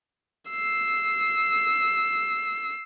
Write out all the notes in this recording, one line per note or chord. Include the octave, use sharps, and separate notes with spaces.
E6 C7